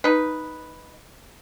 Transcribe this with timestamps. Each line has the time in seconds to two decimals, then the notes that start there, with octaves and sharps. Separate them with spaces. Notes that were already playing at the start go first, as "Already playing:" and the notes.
0.04 D#4 B4